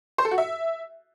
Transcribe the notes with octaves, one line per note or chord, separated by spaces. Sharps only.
C5
A4
F#4
E5